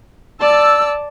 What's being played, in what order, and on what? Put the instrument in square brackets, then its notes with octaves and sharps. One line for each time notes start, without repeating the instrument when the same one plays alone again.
[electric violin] D5 A5 [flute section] E6